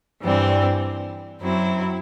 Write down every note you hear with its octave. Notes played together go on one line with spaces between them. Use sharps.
G2 E3 G3 C4
F#2 F#3 C4 E4